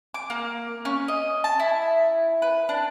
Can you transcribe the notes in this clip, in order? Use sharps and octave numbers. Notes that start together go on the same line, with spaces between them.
D6
A#3
C#4
D#5
A5
E4
B4
D4